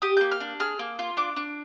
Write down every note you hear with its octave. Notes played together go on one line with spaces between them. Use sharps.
G4 D#6
A#3 G6
F6
D4
G#4 F6
A#3
F4
D4 D6
D4